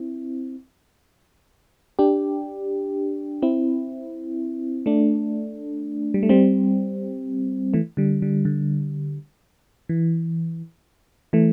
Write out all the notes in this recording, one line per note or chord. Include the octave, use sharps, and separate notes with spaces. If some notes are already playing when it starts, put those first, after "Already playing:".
Already playing: C4 E4
D4 G4
C4 E4
A3 D4
G3
A3
G3 C4
E3 A3
D3 G3
D3 G3
D3
E3
E3 A3